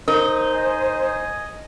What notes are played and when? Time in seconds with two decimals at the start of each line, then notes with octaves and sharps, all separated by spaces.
0.08 D#4 A#4 C5
0.54 D#5 G#5